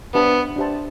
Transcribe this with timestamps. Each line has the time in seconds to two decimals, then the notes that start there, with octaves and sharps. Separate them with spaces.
0.15 B3 D4 G4 C5 E5 A5
0.56 D4 G4 C5 E5 A5